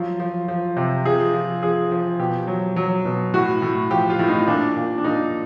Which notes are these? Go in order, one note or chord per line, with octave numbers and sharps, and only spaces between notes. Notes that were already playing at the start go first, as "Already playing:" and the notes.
Already playing: F3 F#3
F3
F3
C3
F3 G#4
F3
F3 G#4
F3
B2 G4
F#3
F#3
B2
A2 F#4
A2
F3 G4
F4
A2
D#4
A#2 D4
A#2
D4
A#2 D#4